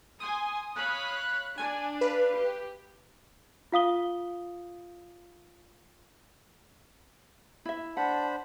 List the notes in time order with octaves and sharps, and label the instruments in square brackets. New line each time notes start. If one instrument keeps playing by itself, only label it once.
[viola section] G#5 C6 [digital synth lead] D#6
[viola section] C#5 F5 B5 [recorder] F#6
[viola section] D4 [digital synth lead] G#5
[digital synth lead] B4 [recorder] F5
[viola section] G4
[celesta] F4 F5 D#6 G7
[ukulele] E4 E5
[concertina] D4 C5 B5 [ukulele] F#5 [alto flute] A5